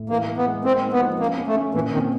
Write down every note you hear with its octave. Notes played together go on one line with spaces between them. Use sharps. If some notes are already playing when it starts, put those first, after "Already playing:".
Already playing: A2
E3 A#3
E3
B3
G#3
A#3 C4
D#4
B3
F3
A#3 C#4
C#4
A3
C#4
A#2 E3
D#3 C4